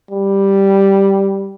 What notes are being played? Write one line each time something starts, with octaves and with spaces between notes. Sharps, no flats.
G3